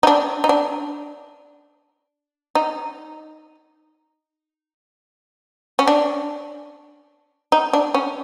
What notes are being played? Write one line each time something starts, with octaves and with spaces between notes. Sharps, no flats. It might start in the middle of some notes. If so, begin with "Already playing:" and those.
D#4
D4
D#4
D4
D#4
C#4
D4
D#4
D4
C#4